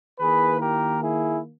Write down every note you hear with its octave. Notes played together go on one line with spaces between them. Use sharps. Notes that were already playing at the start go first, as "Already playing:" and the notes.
D#3 A#3 E4 G#4 B4
G4 A#4
E4 G#4